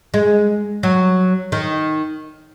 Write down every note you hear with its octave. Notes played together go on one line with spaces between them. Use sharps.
G#3
F#3
D#3